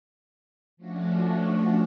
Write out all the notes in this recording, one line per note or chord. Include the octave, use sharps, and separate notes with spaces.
F3 A3 C#4 D4 F#4